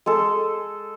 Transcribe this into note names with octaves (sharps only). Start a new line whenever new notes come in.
G#3 A4